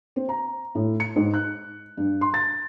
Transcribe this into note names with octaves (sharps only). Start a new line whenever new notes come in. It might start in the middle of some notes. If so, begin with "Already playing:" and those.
C4
A#5
A2
C#7
G#2
F#6
G2
C6
A6